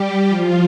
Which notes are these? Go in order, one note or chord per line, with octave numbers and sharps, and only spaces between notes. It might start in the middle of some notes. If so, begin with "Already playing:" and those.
Already playing: G3 G4
F3 F4